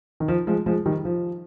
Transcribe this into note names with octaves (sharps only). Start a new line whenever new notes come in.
D#3
F3
F3 G#3
F3 G#3
D#3 G3
F3